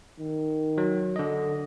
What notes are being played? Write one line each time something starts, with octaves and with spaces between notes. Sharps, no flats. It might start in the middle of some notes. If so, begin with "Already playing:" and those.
D#3
F#3
D3 D#5